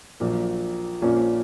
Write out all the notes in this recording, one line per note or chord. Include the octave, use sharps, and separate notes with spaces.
A#1 A#2 F#3 A#3
A#1 A#2 F3 A#3 C#4